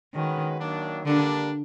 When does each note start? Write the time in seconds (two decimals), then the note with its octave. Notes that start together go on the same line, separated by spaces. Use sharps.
0.14 D#3 G#3 C#4 F#4 B4
0.59 D#3 F#3 A#3 D4
1.05 D3 G3 A#3 D4